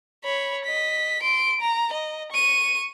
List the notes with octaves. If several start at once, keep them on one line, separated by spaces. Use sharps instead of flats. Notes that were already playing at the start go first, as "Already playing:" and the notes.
C#5 B5
D#5 B6
C6 D7
A#5
D#5
C#6 D#7